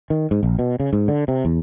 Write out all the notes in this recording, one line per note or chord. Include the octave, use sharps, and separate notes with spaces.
D#3
G#2
A#1
B2
C#3
G#2
D3
C3
E2